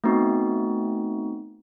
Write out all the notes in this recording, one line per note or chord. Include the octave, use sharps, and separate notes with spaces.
A3 B3 C4 D#4 F#4